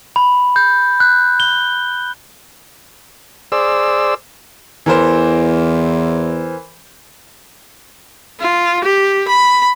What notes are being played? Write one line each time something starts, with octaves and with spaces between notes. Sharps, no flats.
B5
G6
F#6
G7
G#4 C5 D5 E6
E2 E3 A#4 C5
F4
G4
B5